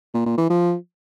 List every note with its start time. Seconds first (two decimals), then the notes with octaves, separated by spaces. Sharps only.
0.14 A#2
0.26 A#2
0.38 E3
0.50 F3